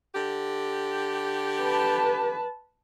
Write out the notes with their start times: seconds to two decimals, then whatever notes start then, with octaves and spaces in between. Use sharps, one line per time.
0.14 D3 G4
1.62 B4 A5